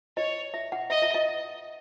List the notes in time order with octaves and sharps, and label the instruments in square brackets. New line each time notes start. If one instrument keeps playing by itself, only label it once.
[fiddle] C#5 [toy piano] D#5
[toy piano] E5
F#5
[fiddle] D#5 [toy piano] E5
[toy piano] E5
D#5